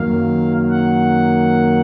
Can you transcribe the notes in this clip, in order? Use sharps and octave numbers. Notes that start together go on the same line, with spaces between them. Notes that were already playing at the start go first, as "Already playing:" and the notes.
Already playing: F#2 D#3 F#3 A#3 F5
F#5